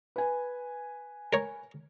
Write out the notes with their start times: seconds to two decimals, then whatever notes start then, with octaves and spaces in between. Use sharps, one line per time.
0.16 B4 G#5
1.33 A#4 C#5